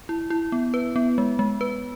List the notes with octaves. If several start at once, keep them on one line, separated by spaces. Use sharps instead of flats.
E4
E4
B3
B4
B3
G#3
G#3
B4